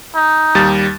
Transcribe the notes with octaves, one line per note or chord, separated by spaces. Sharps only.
D#4
D#2 G3 A6